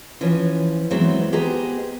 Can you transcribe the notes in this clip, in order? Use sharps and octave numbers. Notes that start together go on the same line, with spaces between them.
E3 F3 C#4
E3 F#3 G#3 B3 C4 E4
B3 G4 G#4 C5 D#5 A#5